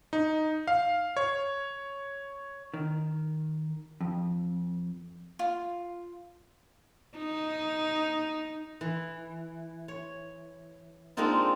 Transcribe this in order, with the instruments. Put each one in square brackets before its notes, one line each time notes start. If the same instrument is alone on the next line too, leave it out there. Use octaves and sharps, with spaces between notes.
[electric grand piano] D#4
F5
C#5
[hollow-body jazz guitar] D#3
F2
[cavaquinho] F4
[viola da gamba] D#4
[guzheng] E3
C#5
G#3 A#3 C4 D4 D#4 F4